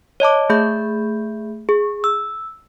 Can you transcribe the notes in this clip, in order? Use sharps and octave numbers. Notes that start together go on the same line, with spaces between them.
C#5 D#5 A5 D6
A3 G#4 E5 B5 G6
G#4
E6